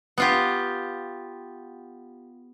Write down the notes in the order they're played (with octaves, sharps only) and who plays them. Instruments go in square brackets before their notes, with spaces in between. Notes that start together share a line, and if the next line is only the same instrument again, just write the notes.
[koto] B3 F4 G4